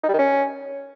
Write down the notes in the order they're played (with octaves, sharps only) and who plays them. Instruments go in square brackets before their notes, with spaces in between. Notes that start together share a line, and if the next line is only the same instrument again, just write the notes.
[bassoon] D#4
G3
D#3
C#4